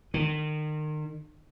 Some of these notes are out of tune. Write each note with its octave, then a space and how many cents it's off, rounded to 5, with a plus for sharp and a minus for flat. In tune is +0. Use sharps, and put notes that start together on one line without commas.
D#3 -35